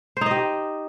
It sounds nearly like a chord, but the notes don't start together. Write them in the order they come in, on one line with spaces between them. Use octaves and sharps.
C5 D#4 D#5 G4